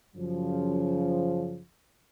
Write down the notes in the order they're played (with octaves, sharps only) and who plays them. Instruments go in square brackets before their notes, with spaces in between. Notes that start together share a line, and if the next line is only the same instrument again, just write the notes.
[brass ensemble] F#2 C#3 F3